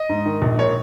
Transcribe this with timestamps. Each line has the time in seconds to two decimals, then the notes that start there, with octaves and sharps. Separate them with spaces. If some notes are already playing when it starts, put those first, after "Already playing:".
Already playing: D#5
0.09 G#2
0.26 D#3
0.42 A#1
0.58 A#2 C#5